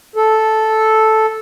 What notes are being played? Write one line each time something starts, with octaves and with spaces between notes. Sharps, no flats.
A4